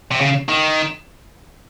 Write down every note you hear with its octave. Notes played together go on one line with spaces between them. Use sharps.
C3
C#3
D#3